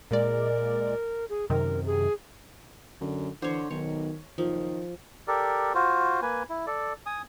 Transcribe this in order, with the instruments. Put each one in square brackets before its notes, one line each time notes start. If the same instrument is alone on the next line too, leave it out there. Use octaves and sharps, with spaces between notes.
[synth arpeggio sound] A#2 G#3 D5 [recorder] A#4
[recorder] G#4
[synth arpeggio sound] F#2 C3 D#3 [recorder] A#4
[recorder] G#4
[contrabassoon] F#2 [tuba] D3
[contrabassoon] D3 [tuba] E3 [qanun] C5 C#5
[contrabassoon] B1 [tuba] D#3 [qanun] C#5
[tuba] F#1 [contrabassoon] D#3 [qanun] F3
[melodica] G4 A4 A#4 D5
F4 F#4 C5
A#3 B4 G#5
E4
A4 D5
G#5 D#6